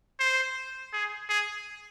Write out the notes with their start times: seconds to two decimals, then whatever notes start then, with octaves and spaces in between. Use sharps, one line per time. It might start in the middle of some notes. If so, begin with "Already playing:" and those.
0.20 C5
0.93 G#4
1.29 G#4